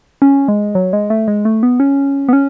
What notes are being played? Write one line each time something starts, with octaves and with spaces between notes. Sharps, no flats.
C#4
G#3
F#3
G#3
A3
G#3
A3
B3
C#4
B3
C#4